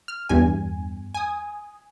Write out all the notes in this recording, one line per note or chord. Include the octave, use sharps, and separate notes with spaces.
F6
E2 G2 G#5
G#5 D#6